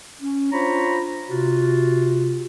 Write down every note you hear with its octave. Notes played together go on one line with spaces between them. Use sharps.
C#4
D4 F4 C5 C#5 A#5 B5
C3 F4 F#4